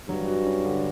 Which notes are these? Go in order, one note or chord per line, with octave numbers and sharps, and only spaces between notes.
G2 F#3
F#4
C#4
D3